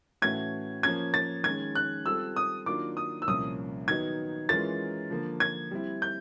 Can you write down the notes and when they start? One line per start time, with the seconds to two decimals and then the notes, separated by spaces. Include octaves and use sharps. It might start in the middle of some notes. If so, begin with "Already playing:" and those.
0.22 A2 E3 A3 C#4 F#4 G#6
0.83 F3 A#3 C#4 G#6
1.14 A6
1.44 D#3 G#3 C#4 G#6
1.75 F#6
2.05 G3 C4 F4 A4 E6
2.36 D#6
2.66 D#3 F#3 A#3 D4 F4 D6
2.97 D#6
3.22 E6
3.27 C2 A#2 F3 A#3 C#4 D#6
3.88 D#3 F#3 B3 D#4 G#6
4.49 E3 G#3 C#4 F4 A#4 A6
5.10 D3 F3 A#3
5.40 G#6
5.71 G3 C4 E4
6.02 G6